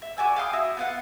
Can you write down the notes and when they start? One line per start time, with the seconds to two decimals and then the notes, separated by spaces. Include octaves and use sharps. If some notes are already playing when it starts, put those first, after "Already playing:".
0.02 E5
0.17 F#4 D5 G#5 E6
0.36 F5 G5 C6 D#6
0.53 E4 F#4 D#6
0.77 B3 F4 F#5